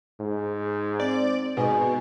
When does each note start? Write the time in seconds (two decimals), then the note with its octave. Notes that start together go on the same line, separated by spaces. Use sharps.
0.20 G#2
1.00 C4 D5
1.57 G#2 B2 G#5